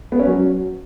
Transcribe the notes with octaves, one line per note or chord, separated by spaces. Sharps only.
B3
C#4
F#3